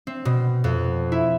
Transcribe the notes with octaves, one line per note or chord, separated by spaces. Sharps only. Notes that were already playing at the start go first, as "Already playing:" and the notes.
C4
B2
F2
E4